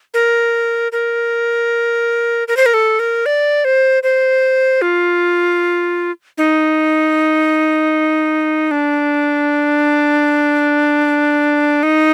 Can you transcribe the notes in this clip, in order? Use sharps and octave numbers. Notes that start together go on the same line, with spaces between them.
A#4
A#4
A#4
C5
A#4
A4
A#4
D5
C5
C5
F4
D#4
D4
D#4